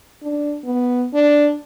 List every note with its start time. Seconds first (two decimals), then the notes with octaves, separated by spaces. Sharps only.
0.23 D4
0.65 B3
1.13 D4